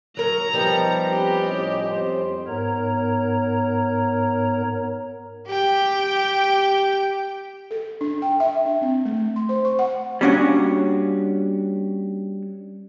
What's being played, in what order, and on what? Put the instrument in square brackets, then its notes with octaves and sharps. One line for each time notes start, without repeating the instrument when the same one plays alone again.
[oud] F#3 A#4 [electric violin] A#5
[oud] F3 G3 B3 [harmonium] D#4 G4
[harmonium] C4 C#4 B4 [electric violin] G4
[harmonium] A2 C#4 D#5
F2 C5
[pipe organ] G#2 B3 A#4 C#5 A#5
[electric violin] G4 G5
[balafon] A4
D4
G5
E5
D4
C4
A3
C6
C5
C#6
F#5
[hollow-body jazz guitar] G3 A#3 C#4 D4 F#4